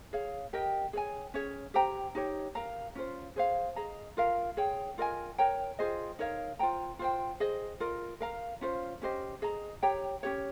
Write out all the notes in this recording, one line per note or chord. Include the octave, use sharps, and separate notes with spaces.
G#4 C#5 F5
G4 A#4 D#5 G5
G#4 C#5 G#5
C#4 G#4 C#5
G4 C5 G5 A#5
D#4 G4 C#5
A#4 F5 A#5
C#4 F4 C5
G#4 C5 F5
G#4 D#5 A#5
F4 A#4 F5
G#4 C#5 G5
F4 A#4 D#5 G#5
A#4 C#5 G5 A#5
F4 G#4 C5 D#5
D#4 A#4 C#5 F5
F4 C5 G5 A#5
F4 C5 G5
G#4 C5 D#5
F4 A#4 D#5
A#4 F5 A#5
C#4 F4 C5 F5
C#4 G4 C5 D#5
G#4 D#5 A#5
G4 C#5 G5 A#5
C#4 G4 C#5